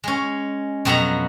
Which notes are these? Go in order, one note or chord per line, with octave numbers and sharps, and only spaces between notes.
G#3 C#4
F2 B2 F#3 B3 F#4 A#5